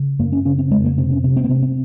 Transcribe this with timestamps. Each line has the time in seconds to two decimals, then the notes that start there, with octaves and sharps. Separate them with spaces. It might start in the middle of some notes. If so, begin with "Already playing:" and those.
Already playing: C#3
0.19 F#2 A#3
0.32 C#4
0.45 C#3 C#4
0.58 C4
0.71 F2 G#3
0.84 A#3
0.97 C3 C4
1.11 C#4
1.24 C3 C4
1.37 C4
1.44 A#3
1.49 C3 C4
1.62 C4